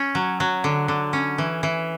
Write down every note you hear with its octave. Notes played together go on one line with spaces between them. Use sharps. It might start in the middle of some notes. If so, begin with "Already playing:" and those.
Already playing: C#4
F#3
F#3
D3
D3
C#4
E3
E3